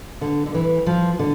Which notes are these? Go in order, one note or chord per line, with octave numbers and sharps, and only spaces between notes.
D3
D3
E3
F3
D3